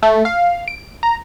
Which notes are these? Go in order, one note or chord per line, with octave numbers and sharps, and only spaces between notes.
A3
F5
D7
A#5